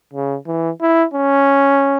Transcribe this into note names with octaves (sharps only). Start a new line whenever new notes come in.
C#3
E3
E4
C#4